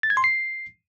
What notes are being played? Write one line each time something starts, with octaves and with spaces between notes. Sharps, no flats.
A6
G#6
C6
C7